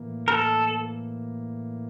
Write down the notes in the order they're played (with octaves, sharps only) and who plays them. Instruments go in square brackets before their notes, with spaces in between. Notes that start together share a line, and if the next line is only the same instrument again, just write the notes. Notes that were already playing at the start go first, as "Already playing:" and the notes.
Already playing: [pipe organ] A2 E3 A#3
[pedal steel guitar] A#4
A4